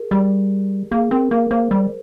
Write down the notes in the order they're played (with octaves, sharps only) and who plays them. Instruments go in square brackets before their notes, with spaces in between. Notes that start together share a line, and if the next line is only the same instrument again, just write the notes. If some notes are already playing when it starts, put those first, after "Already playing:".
Already playing: [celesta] G#4 A#4
[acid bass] G3 [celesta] G4
[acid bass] A#3 [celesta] G#4
[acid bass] C4 [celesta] A#4
[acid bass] A#3 [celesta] A#4
[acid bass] A#3 [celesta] C5
[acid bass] G3